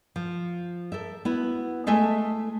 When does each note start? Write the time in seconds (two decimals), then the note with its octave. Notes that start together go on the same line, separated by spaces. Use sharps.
0.16 F3
0.92 A4 A#4 E5
1.25 B3 E4 F#4
1.87 G#3 A3 A4 E5 G#5